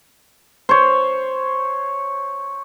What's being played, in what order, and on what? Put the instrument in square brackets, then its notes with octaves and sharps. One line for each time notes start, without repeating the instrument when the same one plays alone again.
[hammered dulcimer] C5 C#5